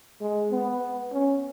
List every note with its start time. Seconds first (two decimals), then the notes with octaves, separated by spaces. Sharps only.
0.21 G#3
0.51 B3
1.13 C#4